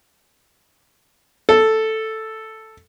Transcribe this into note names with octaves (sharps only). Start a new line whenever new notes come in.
A4